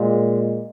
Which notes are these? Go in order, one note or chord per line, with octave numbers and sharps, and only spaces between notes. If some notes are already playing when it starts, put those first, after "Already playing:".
Already playing: A#2 G#3